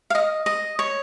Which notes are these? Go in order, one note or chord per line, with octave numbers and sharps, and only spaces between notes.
F5
D#5
D#5
C#5